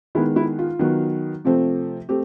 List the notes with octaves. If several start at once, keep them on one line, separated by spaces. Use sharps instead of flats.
D#3 G#3 B3 E4
E4
F4
D#3 F#3 B3
C3 F3 A3 C4
A3 C4 G4